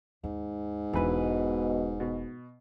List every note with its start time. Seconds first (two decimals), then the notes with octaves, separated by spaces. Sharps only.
0.24 D#2 G#2
0.93 E1 B2 E3 D4 B4
2.00 B2